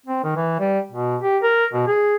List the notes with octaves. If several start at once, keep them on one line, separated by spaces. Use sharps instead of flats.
C4
D#3
E3
G3
B2
G4
A#4
B2
G#4